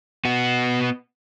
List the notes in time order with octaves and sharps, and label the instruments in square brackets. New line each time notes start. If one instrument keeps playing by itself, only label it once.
[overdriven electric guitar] B3 F#4